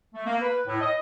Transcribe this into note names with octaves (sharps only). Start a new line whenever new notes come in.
A3
A#3
B4
A2
D#5